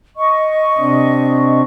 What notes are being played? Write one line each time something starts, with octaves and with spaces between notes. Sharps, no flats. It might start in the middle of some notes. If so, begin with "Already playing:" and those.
D#5 C#6
C3 C4 D4